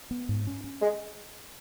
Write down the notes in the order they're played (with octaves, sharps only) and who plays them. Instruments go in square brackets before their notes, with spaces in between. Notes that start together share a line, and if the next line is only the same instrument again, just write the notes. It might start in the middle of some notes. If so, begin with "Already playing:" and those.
[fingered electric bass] B3
G#2
C#4
C#4
[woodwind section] G#3